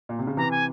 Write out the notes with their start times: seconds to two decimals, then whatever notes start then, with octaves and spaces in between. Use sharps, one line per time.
0.09 A#2
0.19 C3
0.27 C#3
0.37 C3 E3 A#5
0.51 G#5